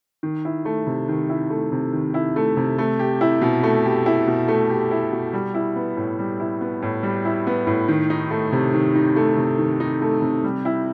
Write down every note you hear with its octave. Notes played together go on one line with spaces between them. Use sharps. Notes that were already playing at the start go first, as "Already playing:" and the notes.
D#3
E4
A3
C3
D#3
E4
A3
C3
D#3
E4
A3
C3
A3
G4
E4
B2
A3
G4
E4
B2
A3
G4
E4
B2
G3
E4
B3
A2
G3
E4
B3
A2
G3
E4
B3
A2
D#3
D#4
A3
C3
D#3
D#4
A3
C3
D#3
D#4
A3
C3
G3
E4